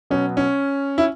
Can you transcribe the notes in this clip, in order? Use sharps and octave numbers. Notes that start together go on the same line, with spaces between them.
B2 F#3 B3 C#4
C#4
E4